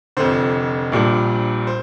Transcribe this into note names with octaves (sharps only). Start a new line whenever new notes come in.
F1 F2 D3 C5
A#1 A#2 G3 D4
C5